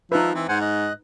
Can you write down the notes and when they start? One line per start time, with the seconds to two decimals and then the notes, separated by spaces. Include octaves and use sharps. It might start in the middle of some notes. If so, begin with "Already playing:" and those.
0.12 F3 D#4 B4 E5
0.35 E3 C4
0.49 G#2 C5 F#5 G#5
0.61 D#5 F#6